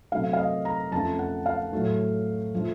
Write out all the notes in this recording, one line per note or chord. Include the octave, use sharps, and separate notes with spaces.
C3 F#3 A3 F5
F5
D#5
A#5
F2 C#3 F3 A3 A5
F#5
F5
A2 F#3 A3
F3 A3